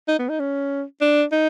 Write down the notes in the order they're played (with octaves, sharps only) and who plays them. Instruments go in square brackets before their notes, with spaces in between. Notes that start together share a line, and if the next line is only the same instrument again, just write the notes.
[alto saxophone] D#4
B3
D#4
C#4
D4
D#4